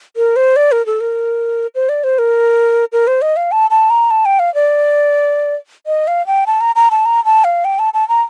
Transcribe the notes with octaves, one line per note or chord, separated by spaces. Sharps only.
A#4
C5
D5
A#4
A4
A#4
C5
D5
C5
A#4
A#4
C5
D#5
F5
A5
A5
A#5
A5
G5
F5
D5
D#5
F5
G5
A5
A#5
A#5
A5
A#5
A5
F5
G5
A5
A5
A#5